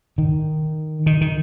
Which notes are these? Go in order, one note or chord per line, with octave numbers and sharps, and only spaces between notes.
D#3
D#3
D#3